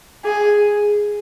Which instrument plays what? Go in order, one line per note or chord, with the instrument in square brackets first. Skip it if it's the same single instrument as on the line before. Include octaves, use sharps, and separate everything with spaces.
[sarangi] G#4